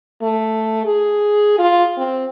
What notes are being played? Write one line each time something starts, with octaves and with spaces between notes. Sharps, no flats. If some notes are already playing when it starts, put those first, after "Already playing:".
A3
G#4
F4
C4